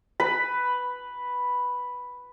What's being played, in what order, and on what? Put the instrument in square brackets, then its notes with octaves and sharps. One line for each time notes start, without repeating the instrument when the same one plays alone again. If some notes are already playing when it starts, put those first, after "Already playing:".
[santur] B4 B5